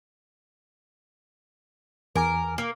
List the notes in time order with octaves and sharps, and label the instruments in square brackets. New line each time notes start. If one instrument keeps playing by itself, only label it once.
[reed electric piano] E2 G#5 D6 [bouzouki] A#4
[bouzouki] A#3